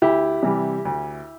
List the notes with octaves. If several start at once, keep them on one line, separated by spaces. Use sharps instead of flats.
D2 E4 G4
C3 E3 G3
D2